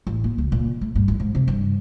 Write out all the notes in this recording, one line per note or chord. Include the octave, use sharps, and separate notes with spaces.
A1
A#3
C#2
A#2
A3
G2
A1
G#2
C3
G2